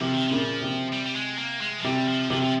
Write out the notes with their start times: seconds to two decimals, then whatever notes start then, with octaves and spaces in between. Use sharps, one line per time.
0.01 C3 F3
0.14 D#3
0.27 A#2 C#3 F3
0.62 C3
0.92 G3
1.06 G3
1.15 G#3
1.38 A#3
1.61 G#3
1.79 F3
1.84 C3 G3
2.08 F3
2.30 C3 F3
2.42 F3